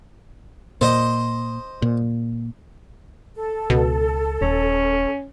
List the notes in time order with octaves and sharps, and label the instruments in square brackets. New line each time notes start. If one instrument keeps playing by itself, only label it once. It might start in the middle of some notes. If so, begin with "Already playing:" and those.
[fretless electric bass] A#2 [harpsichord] C5 D#5
[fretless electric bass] A#2
[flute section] A4
[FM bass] C#2 [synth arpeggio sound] B2
[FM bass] D#1 [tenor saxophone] C#4